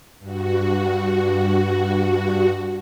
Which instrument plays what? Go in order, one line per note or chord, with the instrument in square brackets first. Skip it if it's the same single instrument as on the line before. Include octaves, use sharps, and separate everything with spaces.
[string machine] G2 F#4